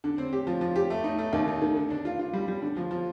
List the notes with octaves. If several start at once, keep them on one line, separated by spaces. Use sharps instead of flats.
D3
C4
G4
F3
F3
G4
A3
D#4
A3
D#2
D#4
D#3
D3
D4
F4
F4
G3
G3
D3
F3
F3